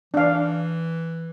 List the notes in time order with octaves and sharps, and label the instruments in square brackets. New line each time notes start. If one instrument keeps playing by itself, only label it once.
[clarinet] E3 [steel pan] D4 F5